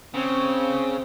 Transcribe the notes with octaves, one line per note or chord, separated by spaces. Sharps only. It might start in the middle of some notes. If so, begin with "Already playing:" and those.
C#3 C4